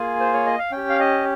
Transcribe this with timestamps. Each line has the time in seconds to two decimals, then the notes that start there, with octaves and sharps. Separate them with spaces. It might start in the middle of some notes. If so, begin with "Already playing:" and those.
Already playing: A#3 F4 G#4 G#5
0.20 C5
0.34 C#5
0.46 D#5
0.59 F5
0.72 C#4 G4 G5
0.89 F5
1.00 D#5